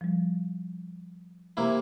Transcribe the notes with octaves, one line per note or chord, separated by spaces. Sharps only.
F3 G3
C3 A#3 E4